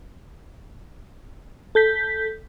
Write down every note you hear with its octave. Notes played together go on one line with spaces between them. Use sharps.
A4 G6 B6